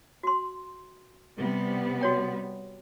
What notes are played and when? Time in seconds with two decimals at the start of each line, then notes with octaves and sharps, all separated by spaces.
0.23 F#4 C6
1.39 C3 G3 B3
2.01 F#4 C#5 G5